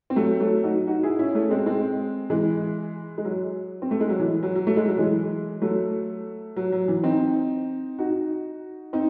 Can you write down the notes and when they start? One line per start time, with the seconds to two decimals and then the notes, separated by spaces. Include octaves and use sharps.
0.10 C4
0.16 F#3 A3
0.40 F#3 A3
0.63 D#4 F#4
0.87 D#4 F#4
1.03 E4 G#4
1.19 C#4 E4
1.35 A3 C#4
1.50 G#3 C4
1.66 G#3 C4
2.30 E3 G#3
3.18 G#3
3.25 F#3
3.82 C4
3.91 A3
4.01 G#3
4.09 F#3
4.19 E3
4.43 F#3
4.55 F#3
4.67 A3
4.77 G#3
4.88 F#3
4.98 E3 G#3
5.61 F#3 A3
6.56 F#3
6.72 F#3
6.88 E3
7.03 C4 D#4
7.98 D#4 F#4
8.93 C4 D#4